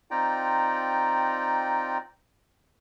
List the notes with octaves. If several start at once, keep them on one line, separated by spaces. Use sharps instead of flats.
C4 D#4 F4 D5 G5 A#5